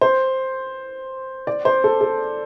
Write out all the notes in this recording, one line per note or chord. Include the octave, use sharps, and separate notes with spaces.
C5
D5
C5
A4
A4